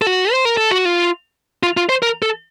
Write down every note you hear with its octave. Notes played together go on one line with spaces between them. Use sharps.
A4
F#4
C5
A#4
A4
F#4
F4
F4
F4
C5
A#4
A4